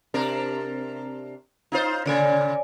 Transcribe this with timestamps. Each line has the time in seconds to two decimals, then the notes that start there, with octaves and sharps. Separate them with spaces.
0.14 C3 D4 A#4
1.72 D#4 F4 C5
2.06 A#2 C#3 C#5 D5 G#5